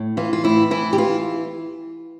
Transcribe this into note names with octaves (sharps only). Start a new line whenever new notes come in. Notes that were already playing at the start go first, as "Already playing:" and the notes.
Already playing: A2
E3 F4
F4
A2 E4
E3 E4
G4
E3 F4